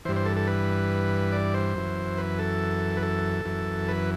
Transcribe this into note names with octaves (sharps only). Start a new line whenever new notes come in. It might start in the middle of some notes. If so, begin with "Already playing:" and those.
G2 E3 C5
C5
A4
A4
B4
D5
C5
F#2 E3
B4
A4
B4
A4
F#2 E3
B4